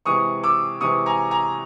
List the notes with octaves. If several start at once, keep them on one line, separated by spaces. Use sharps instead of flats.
C3 E3 G#3 C#6 D#6
D6 E6
C3 E3 G#3 C#6 D#6
G#5 A#5
G#5 A#5